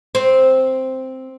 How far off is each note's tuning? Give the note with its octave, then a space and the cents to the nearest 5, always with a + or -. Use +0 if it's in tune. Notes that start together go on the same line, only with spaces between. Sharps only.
C4 +0